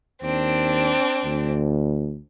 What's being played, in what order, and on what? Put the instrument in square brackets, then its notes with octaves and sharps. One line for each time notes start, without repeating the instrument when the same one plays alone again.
[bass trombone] D#2 [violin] C4 D4
[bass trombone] D2